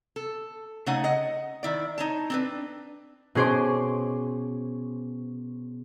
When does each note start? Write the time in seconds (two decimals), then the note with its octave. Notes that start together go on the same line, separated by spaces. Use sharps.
0.16 A4
0.86 C#3 A3 D#4 C#5 F#5
1.04 D#5 F#5
1.63 D#3 E4 D5
1.98 D#4 C#5 A5
2.30 C4 D4 B4
3.35 B2 C#4 G#4 C5 C6 D6